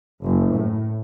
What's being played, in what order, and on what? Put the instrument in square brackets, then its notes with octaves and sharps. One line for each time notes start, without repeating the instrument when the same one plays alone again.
[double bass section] F#1
A2